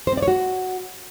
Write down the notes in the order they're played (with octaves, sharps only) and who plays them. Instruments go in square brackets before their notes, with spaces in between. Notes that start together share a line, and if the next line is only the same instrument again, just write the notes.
[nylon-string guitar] C5
C4
D5
C#5
F#4